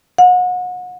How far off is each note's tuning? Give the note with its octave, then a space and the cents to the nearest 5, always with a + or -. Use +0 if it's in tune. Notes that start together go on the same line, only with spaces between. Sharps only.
F#5 -35